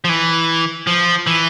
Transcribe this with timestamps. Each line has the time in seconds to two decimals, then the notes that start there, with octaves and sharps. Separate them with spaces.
0.04 F3
0.09 E3
0.87 F3
1.27 E3